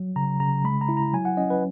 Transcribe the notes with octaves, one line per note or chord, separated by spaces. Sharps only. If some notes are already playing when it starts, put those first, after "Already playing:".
Already playing: F#3
C#3 A#5
C#3 A#5
G#3 B5
A#5
E4
A#5
F#3 G#5
F#5
C#4 D#5
B4